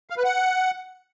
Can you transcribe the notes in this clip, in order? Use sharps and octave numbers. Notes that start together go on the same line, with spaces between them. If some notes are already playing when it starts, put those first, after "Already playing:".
F5
B4
F#5